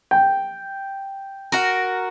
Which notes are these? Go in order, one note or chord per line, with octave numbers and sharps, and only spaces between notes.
G5
F#4 A#4